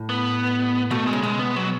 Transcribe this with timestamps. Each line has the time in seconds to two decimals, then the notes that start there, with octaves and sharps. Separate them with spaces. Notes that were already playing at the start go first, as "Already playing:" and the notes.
Already playing: A2
0.09 B3
0.91 B2 A3
1.07 G#3
1.13 C#3
1.23 B2 G#3
1.39 B3
1.56 F#3